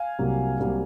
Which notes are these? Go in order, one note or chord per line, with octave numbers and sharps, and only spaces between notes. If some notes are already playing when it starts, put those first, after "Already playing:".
Already playing: F5 G#5
C2 C3 F#3 A#3
C2 C3 F#3 A#3